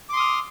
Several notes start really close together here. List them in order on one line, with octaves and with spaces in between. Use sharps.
D6 C6 D#6 F6